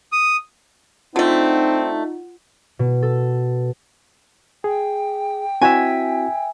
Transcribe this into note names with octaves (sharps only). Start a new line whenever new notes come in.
D#6
D3 A3 C4 D#4 F4 F#5
B2
A4
G#4 G5
C4 E4 F#4 E5 G#5